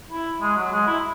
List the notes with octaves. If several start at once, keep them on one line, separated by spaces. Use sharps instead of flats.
E4
G#3
F#3
G#3
E4